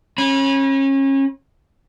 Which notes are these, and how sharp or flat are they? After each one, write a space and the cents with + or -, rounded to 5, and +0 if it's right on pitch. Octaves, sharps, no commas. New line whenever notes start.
C#4 -30 B5 -30